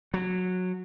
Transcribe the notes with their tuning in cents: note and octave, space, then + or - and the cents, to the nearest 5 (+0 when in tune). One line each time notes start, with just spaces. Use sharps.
F#3 -15